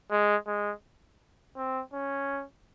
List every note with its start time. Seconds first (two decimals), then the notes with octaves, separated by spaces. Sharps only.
0.11 G#3
0.47 G#3
1.57 C4
1.93 C#4